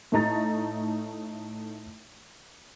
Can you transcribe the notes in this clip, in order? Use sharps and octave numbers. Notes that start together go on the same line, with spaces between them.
A2 A3 D#4 A#5 A6